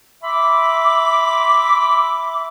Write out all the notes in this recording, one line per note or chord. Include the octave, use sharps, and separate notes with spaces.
E5 B5 C6 D6